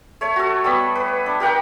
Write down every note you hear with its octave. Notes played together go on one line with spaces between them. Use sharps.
A3 C#5
F#4 A4
G3 B3 B5
B4
D4
G4 A#4 F#5 G5